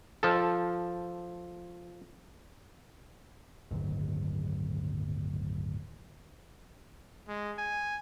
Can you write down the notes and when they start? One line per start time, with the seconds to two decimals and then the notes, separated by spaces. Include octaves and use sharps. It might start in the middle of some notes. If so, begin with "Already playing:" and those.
0.23 F3 A4
3.71 D1 G1 D#3 F#3
7.28 G#3
7.58 G#5